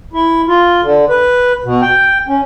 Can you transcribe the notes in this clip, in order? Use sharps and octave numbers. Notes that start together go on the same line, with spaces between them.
E4
F4
D3
B4
B2
G5
C#4